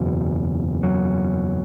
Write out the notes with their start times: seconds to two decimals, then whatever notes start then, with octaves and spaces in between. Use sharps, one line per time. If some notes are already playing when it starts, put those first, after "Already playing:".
Already playing: F#1 E2 B2 F#3
0.83 F#3